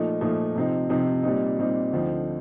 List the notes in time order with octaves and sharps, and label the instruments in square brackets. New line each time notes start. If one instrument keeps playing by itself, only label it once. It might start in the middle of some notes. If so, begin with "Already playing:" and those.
Already playing: [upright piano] A#2 F3 A3 D#4
A#2 F3 A3 D#4
C3 F3 C4 D#4
C3 F3 C4 D#4
A#2 G3 C4 D#4
A#2 G3 C4 D#4
D2 D3 F3 C4 D#4